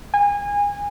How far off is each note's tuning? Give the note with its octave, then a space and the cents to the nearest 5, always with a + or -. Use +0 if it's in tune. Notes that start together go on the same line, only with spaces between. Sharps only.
G#5 -30